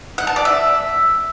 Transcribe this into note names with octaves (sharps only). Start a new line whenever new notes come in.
F#5
A5
D5
E5